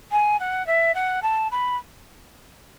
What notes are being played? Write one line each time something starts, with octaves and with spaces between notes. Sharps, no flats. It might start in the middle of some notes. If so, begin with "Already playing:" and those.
G#5
F#5
E5
F#5
A5
B5